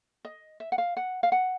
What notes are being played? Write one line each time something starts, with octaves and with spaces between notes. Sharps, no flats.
D#5
E5
F#5
F5
F#5
F5
F#5